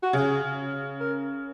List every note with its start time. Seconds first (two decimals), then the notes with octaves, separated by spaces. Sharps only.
0.03 F#4
0.13 C#3 G#4
1.01 A#4